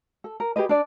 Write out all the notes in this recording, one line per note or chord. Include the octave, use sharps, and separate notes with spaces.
A4
A#4
G4 G#4 B4 D#5
D4 D5